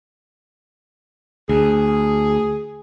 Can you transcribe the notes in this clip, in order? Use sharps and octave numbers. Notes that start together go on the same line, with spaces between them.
D2 G#4